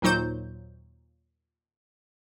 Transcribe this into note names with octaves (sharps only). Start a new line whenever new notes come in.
D#2 A#2 F#3 D#4 C5 G6